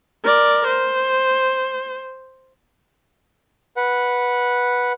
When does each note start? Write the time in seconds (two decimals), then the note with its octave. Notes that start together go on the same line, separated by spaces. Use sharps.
0.24 A#4 D5
0.67 C5
3.76 B4 F#5